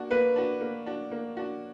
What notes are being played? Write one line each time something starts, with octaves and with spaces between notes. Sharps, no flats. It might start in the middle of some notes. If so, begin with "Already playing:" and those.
Already playing: A#3 D4 F#4
A#3 B4
D4 F#4
A#3
D4 F#4
A#3
D4 F#4